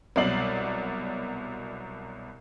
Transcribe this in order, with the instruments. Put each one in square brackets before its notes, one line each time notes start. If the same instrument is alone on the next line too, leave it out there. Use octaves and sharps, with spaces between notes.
[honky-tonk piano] C2 B2 F#3 D5 C7 F#7